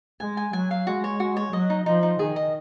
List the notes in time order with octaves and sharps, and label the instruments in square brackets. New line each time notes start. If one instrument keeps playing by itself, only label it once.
[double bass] G#3 [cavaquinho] G#5
[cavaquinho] G#5
[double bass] F#3 [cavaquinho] G#5
[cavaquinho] F5
[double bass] G#3 [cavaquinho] F#4
[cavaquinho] C#5
F#4
C#5
[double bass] F#3 [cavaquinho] D#5
[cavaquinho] D#4
[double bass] F3 [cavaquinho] D#4
[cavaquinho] D#4
[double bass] D#3 [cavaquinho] G#4
[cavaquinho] D#5